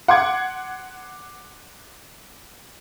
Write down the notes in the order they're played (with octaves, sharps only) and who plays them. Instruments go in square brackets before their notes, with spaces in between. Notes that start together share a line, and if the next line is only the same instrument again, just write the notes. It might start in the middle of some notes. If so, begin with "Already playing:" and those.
[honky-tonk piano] F#5 [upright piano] C6 D6 G#6